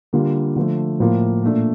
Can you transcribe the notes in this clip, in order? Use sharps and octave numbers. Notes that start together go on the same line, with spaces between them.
D3 G3 A#3 F4
D3 F3 A3
A2 F3 A#3 F4
A#2 A3 D4